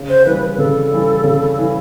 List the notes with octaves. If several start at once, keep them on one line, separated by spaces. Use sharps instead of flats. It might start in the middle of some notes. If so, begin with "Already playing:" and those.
Already playing: C#3
C5
E3 G3 B4
B4
C#3 A4
E3 G3
C#3
E3 G3